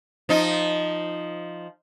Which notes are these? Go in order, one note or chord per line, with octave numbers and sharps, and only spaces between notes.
F3 D#4